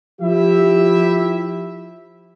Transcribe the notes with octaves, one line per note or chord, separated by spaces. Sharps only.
F3 E4 G4 E5